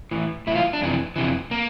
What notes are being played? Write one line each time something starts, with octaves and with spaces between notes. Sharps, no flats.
A2 E3
A2 E3 E4 F4
D4
F2 C3 E3
F2 C3 E3
A#3